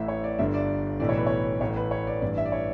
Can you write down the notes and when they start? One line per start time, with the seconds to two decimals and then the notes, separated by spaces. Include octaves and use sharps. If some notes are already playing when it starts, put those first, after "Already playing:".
Already playing: A1 A2 E3 E5
0.08 C#5
0.24 D5
0.39 G1 G2 D3 E5
0.54 D5
1.00 B1 A2 E3 D5
1.09 C#5
1.18 B4
1.27 C#5
1.61 A1 A2 E3 C#5
1.76 B4
1.91 C#5
2.07 D5
2.22 A1 G2 E3 D5
2.38 E5
2.46 D5
2.52 C#5